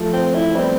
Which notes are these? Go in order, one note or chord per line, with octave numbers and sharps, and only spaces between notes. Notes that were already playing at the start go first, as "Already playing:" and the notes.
Already playing: F3 A3
C4
E4
G3 B3 C4